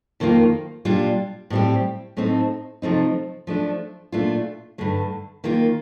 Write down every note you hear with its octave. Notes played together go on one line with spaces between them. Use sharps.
F2 D#3 A#3 F4
A#2 G3 D4 F4
A2 G3 C4 G4
A2 A3 C4 D#4
C3 F3 A3 C4 D#4
F3 A3 D4
A#2 A3 D4 F4
G2 D3 A3
D#3 A#3 F4